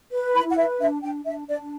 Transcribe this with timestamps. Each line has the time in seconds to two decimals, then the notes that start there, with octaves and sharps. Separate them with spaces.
0.12 B4
0.34 E4 B5
0.50 F#5
0.57 B4 E5
0.80 D4 E5
1.02 D4 G5
1.25 D4 E5
1.48 D4 D5